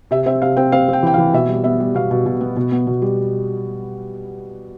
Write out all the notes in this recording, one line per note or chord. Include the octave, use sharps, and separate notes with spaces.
C3 E5
C4 E5
C3 F5
C4 G5
C4 F5
C4 G5
E3 G5
F5
E3
B2 E5
G3
B3 E5
G3
B2 F5
B2
B2
B3
B2
B3
B2
G3